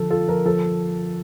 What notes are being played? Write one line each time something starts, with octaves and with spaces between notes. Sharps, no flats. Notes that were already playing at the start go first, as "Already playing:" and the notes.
Already playing: D3 F3 A4
F4 A4
F3 A#4
F3 A4